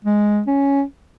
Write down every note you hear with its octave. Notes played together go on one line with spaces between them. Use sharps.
G#3
C#4